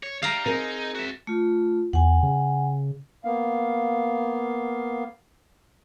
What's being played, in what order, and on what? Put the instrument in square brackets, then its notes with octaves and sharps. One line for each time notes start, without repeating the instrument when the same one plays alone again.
[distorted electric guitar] C#5
[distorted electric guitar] G3 [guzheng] F5 A#5
[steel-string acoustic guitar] C4 G#4 A#4 [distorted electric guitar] D#4
[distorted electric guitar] F#4 E5
[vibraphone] A3 F4
[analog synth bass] E2 [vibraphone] F#5 G#5
[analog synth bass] C#3
[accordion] A#3 B3 F5